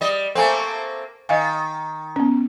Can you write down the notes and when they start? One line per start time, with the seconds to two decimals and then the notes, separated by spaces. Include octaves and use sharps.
0.01 G3 D#5
0.35 A3 A#3 C4 A4 G#5
1.29 D#3 D#5 F5 G#5
2.16 B3 C#4